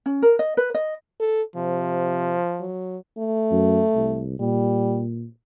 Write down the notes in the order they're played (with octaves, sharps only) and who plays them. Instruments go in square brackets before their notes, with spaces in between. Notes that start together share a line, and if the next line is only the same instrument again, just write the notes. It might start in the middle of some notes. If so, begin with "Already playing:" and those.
[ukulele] C#4
A#4
D#5
B4
D#5
[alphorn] A4
[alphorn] C3 [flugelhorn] F3
[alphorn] F#3
A3
[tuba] F#2
C2
[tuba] A#2 [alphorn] G3